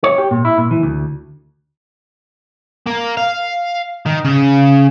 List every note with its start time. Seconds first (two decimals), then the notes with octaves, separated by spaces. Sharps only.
0.04 C#5
0.18 G4
0.31 A#2
0.45 E4
0.58 A#2
0.71 E3
0.83 D2
2.87 A#3
3.17 F5
4.06 D#3
4.25 C#3